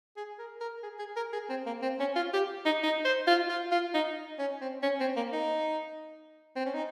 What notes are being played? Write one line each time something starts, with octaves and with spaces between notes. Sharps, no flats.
G#4
A#4
A#4
G#4
G#4
A#4
G#4
C4
A#3
C4
C#4
F4
G4
D#4
D#4
C5
F4
F4
F4
D#4
C#4
C4
C#4
C4
A#3
D#4
C4
C#4
D#4